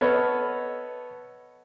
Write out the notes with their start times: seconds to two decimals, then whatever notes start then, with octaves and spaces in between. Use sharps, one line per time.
0.01 B3 A4 B4 C#5 D#5 F6